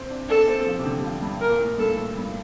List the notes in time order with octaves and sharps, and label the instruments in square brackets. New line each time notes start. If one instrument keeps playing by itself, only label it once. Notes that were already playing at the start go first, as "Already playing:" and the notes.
Already playing: [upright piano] C4
D4
[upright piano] D4 [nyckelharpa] A4
[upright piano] C4
F3
C3
D3
G3
F3
G2
[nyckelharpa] A#4
[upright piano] A#2
A2
[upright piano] G2 [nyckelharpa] A4
[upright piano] A2
G2